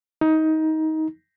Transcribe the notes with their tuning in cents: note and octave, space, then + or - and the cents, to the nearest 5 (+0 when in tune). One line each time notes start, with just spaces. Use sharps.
D#4 +20